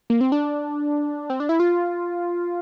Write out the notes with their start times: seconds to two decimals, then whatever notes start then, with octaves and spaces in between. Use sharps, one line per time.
0.10 A#3
0.21 C4
0.32 D4
1.30 C4
1.40 D4
1.49 E4
1.60 F4